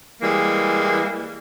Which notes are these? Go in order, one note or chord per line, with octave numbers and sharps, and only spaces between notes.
E3 G3 G#3 A#3